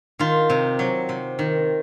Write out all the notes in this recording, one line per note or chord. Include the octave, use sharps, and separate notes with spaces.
D#3 F4
C3
F#3
C3
D#3